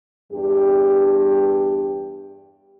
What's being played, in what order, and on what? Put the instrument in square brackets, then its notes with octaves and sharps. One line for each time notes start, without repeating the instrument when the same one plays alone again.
[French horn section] E2 G2 G4